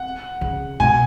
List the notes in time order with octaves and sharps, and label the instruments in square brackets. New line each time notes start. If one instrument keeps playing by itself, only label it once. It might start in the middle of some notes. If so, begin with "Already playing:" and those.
Already playing: [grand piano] F#5
[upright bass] C#3
[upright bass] B2 [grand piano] G#5